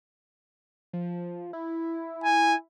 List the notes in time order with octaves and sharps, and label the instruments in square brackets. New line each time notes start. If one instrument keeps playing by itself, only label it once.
[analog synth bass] F3
E4
[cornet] G#5